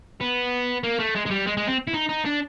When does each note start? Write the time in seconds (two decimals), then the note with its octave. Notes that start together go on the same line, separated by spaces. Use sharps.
0.21 B3
0.83 A#3
0.99 A3
1.15 G#3
1.26 G#3
1.31 G3
1.47 G#3
1.57 G#3
1.67 C4
1.87 E4
1.94 D#4
2.09 D#4
2.25 D4